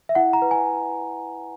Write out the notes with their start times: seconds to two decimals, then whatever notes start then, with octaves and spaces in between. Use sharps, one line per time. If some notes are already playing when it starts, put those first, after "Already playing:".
0.09 E5
0.15 E4 F#5
0.33 A#5
0.42 B4
0.51 G#5